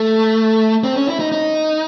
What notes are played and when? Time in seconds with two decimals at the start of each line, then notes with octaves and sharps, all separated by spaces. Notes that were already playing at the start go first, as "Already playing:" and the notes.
Already playing: A3
0.84 C4
0.96 C#4
1.09 E4
1.20 D#4
1.32 D#4